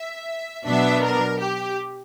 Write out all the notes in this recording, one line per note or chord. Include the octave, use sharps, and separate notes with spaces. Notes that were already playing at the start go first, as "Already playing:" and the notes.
Already playing: E5
B2 F#3 B3 D4 E5
A#4
G4